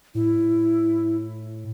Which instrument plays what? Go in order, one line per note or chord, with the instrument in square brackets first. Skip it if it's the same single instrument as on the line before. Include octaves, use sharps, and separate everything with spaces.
[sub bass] A2 [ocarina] E4